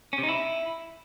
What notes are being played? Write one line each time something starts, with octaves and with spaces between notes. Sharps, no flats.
C#4
C3
D#4
E4